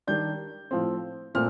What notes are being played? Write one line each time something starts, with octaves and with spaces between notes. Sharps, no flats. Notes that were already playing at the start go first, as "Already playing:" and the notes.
D#3 G3 D4 G6
A2 F3 C4
A#2 A3 C4 F6